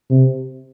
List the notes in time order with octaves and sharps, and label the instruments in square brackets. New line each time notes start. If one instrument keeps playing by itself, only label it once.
[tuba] C3